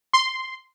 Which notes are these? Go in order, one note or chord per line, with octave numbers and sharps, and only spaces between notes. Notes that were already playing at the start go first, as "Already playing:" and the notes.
C6